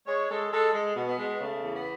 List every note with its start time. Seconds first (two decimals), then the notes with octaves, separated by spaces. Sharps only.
0.07 G#3 C#5
0.29 G#3 A4
0.52 G#3 A4
0.73 G#3
0.96 B2
1.07 B3
1.17 G#3
1.39 C#3 A3
1.62 E2
1.73 B3